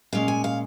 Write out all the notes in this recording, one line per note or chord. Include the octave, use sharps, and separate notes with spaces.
A#2 G#3 C#4 F5
G#5
F5